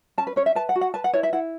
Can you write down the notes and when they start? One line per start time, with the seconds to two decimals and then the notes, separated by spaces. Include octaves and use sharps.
0.18 C#4 A5
0.27 B4
0.36 C#4 C#5
0.46 E5
0.55 B4 A5
0.69 F#5
0.75 F#4
0.81 F#5
0.94 B4 A5
1.04 F#5
1.13 E4 C#5
1.23 E5
1.33 E4 F#5